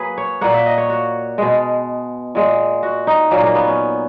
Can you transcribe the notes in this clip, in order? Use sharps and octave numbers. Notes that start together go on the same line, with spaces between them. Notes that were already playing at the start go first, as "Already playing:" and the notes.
Already playing: F#3 A#3 G#4 B4
C#5
A#2 A#3 F#5
E5
D#5
C#5
F#4
B2 G#3
A#2 G#3
F#4
D#4
A#2 F#3 A#3 C#4
A#3
B3
C#4